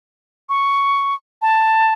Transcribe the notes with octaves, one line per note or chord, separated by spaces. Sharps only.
C#6
A5